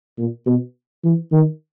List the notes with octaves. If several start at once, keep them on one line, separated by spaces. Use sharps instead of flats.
A#2
B2
E3
D#3